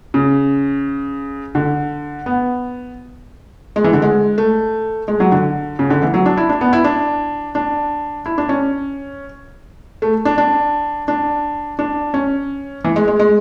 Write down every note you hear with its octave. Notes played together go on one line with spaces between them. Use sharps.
C#3
D3
B3
G#3
E3
D3
G#3
A3
G#3
F#3
D3
C#3
D3
E3
F#3
D4
E4
D4
B3
E4
D4
D4
E4
D4
C#4
A3
D4
D4
D4
D4
C#4
E3
G#3
G#3
G#3